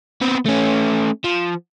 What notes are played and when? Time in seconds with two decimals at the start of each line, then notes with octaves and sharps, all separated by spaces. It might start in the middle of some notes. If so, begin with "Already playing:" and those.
0.22 B3 C4
0.46 A3 C#4
1.24 F3